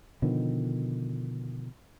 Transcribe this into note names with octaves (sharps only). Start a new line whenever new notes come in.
B2 D3 D#3 F3